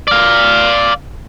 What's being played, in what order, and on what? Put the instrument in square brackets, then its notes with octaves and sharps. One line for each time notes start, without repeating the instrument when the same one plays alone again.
[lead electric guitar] D5 F5